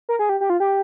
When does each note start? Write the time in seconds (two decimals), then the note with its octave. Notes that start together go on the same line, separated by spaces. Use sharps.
0.09 A#4
0.19 G#4
0.29 G4
0.41 G4
0.50 F4
0.60 G4